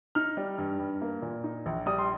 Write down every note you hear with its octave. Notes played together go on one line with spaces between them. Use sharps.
D#4 F6
G3
G2
G2
A#3
A#2
D#4
A#1
G3 D#6
C6